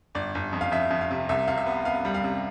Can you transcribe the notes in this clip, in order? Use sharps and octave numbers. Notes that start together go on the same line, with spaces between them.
G1 D5
G1
F2
F5
F2 E5
F2
F5
C3
C2 E5
C3 F5
E5
B3
B3 F5
G3
F5
C3